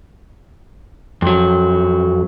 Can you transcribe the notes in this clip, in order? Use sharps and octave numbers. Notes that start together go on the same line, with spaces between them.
F2 F#3